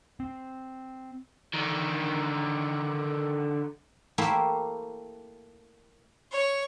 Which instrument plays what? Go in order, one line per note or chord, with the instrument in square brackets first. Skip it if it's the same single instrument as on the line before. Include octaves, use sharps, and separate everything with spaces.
[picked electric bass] C4
[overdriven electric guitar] D3 D#3
[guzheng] A3 A#3 E4 G4 C5
[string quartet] C#5